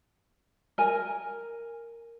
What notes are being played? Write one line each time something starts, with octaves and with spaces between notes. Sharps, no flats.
A#4 G#5